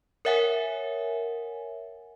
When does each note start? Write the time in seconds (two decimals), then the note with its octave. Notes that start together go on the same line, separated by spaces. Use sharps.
0.25 A#4 C#5 E5 F#5 G#5